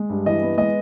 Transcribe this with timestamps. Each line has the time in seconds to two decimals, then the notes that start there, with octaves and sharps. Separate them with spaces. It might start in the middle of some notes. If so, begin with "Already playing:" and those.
Already playing: G#3
0.10 G2
0.26 E3 D#5
0.42 B3
0.58 G#3 D#5